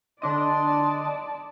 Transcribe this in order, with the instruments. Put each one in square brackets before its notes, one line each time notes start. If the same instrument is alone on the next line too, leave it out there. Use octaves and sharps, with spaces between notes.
[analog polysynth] D3 D4 D#5 [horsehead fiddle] D5 A5 [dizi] C6